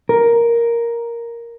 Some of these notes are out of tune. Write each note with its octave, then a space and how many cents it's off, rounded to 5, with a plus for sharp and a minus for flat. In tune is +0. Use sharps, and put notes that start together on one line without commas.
A#4 +5